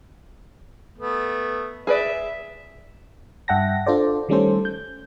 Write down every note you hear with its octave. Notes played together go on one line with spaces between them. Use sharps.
A3 B3
G#4 B4 D5 E5
G2 E5 F#5 G5 A5 A#6
D4 F4 A4 C5 D5
D#3 G3 A3 C#4 A4 C5
G6